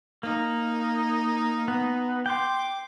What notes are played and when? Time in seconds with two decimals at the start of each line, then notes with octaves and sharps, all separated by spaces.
0.23 A#3 D#4
1.68 B3
2.26 G5 C6 D6